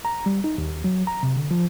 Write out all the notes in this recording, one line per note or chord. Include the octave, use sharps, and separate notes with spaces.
A#5
G3
D#4
D#2
F#3
A#5
C3
D3
F3